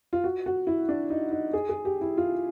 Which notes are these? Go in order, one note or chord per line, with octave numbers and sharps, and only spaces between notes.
F4
F#4
F#4
E4
D4
D#4
D#4
G#4
G#4
G4
E4
F4